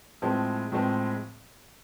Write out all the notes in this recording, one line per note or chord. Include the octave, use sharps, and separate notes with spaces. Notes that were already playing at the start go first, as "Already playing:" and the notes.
A2 F3 G#3 C4
A2 F3 G#3 C4